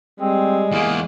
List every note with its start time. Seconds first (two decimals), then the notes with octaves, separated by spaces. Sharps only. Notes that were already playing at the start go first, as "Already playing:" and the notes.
0.20 G3 G#3 C4
0.72 E2 A#3 G#4